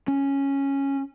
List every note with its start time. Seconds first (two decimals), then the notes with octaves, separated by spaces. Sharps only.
0.08 C#4